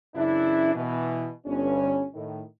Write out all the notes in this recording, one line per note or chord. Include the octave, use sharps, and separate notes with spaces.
F#2 C#3 E3 D4 E4
B2 E3
G1 G2 C#4
A2 D#3